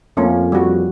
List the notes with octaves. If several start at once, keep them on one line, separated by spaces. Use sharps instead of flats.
F2 A3 A#3 C#4
G3 F#4